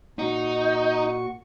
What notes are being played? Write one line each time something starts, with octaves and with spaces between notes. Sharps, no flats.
A#2 D#4 F#4 C#6